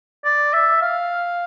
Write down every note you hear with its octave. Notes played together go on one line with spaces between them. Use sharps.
D5
E5
F5